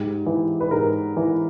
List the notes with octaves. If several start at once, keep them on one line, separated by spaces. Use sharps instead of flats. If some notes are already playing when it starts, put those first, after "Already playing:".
Already playing: G#2 G4
E3
B4
G#2 A#4
E3